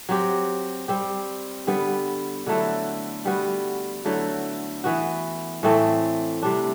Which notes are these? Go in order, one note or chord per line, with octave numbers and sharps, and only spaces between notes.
F#3 C4 G4
G3 C4 G4
D3 G3 B3
D3 F#3 A3 E4
G3 B3 F#4
D3 F#3 A3 E4
E3 B3 F#4
A2 E3 A3 C4
C3 G3 D4